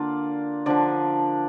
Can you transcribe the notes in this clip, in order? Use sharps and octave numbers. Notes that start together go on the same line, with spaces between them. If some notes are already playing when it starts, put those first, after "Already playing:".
Already playing: D3 A#3 F4 D5
D3 F3 D4 D5